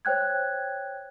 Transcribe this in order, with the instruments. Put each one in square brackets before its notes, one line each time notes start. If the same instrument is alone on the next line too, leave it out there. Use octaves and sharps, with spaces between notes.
[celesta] C5 C#5 G5 F#6 G#6